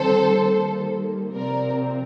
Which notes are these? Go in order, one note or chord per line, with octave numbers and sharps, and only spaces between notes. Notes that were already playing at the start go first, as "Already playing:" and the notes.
Already playing: D#3 G3 C4 A4 C5
D#3 G3 A#3
C3 F3 C4 A#4 D5